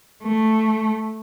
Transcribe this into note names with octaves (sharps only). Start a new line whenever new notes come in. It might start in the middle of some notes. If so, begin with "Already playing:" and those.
A3